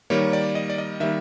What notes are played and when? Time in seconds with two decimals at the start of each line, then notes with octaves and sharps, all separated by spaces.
0.10 D#3 G3 A#3 C#5
0.33 D5
0.55 D#5
0.70 D5
0.78 D#5
1.00 D#3 G3 A#3 E5